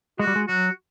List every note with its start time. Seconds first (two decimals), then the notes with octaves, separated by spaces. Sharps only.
0.19 G#3 F#4
0.27 G3
0.36 G#3
0.48 F#3 F#4